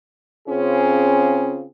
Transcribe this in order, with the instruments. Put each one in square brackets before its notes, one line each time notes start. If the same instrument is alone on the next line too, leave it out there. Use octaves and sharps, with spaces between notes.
[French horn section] C#3 C4 C#4 F4 G#4